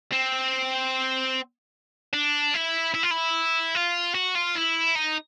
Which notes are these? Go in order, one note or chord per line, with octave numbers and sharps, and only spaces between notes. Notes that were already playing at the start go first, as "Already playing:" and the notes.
C4
D4
E4
E4
F4
E4
F4
F#4
F4
E4
D#4